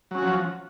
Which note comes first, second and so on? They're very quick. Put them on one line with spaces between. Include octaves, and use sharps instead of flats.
F#3 C#4 F#4 F3